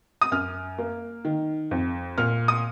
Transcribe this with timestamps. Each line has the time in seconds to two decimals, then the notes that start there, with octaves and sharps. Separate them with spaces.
0.21 D#6
0.32 F#2 F6
0.78 A#3
1.25 D#3
1.71 F2
2.18 A#2 F6
2.48 D#6